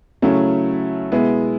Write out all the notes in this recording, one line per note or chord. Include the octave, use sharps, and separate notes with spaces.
C#3 F#3 A3 C#4 E4
B2 G#3 B3 E4